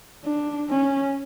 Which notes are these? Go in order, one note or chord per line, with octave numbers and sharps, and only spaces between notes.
D4
C#4